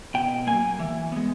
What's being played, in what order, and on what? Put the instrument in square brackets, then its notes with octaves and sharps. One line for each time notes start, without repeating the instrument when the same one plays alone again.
[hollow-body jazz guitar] B2 G5
F#3 A#3 G#5
E3
G#3 B3